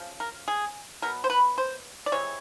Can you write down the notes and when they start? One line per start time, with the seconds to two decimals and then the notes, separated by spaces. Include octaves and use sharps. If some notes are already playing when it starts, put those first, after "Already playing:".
Already playing: C#3 F3
0.20 A#4
0.48 G#4
1.02 B2 F#3 B3 A#4
1.24 C5
1.30 B4
1.58 C5
2.06 D5
2.12 C3 E3 G#3 C4 C#5